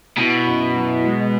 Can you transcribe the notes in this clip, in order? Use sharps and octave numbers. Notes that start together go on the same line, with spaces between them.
B2 E4
F#2
F#3
G#3